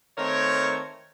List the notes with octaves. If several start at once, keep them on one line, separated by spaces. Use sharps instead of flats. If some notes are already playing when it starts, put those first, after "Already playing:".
D#3 A3 C4 A#4 C#5